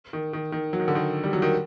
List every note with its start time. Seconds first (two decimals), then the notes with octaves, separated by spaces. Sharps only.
0.13 D#3
0.33 D#3
0.52 D#3
0.73 F#3
0.80 D#3
0.88 D3
0.95 D#3
1.24 G3
1.33 F#3
1.42 D#3